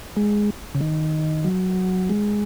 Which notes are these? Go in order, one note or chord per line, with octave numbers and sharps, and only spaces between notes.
G#3
C#3
D#3
F#3
G#3